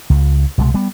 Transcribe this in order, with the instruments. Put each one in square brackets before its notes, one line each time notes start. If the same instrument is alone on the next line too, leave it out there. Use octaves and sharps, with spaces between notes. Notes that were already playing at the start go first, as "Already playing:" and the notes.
[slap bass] C#2
C2 B2 E3 G#3
G3 B3